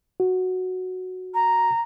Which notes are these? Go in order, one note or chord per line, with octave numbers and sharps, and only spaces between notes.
F#4
A#5